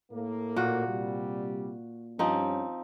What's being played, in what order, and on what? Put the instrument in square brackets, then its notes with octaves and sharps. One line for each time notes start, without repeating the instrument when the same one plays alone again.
[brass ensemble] A2 A#3
[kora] A#2 F#4
[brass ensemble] C3 G3
[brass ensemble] G2 C#4 [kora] F3 C4 D#4